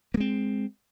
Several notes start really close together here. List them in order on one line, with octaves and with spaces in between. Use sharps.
A#3 G#3 C4